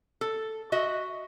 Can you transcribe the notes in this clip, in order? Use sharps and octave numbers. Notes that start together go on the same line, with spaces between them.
A4
F#4 D#5 E5